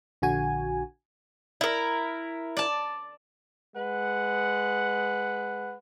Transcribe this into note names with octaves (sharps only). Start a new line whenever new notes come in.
A#1 D3 F#4 G#5
E4 A#4
D5 A5
G#3 B4 F#5